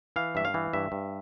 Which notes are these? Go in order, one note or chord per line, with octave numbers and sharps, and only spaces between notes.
E3 F5
G2 E5
F5
E3
G2 E5
G2